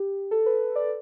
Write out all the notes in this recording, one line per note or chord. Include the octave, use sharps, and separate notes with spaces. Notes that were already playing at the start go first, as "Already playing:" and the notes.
Already playing: G4
A4
B4
D5